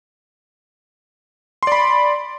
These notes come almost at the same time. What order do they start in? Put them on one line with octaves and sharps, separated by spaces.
C6 D5 B5